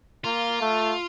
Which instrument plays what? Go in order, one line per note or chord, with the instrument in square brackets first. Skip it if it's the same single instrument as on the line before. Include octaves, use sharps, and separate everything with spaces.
[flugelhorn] A#3 [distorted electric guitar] F4
[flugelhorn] A3